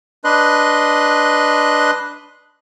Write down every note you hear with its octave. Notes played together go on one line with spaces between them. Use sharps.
D4 B4 D#5 C6 F#6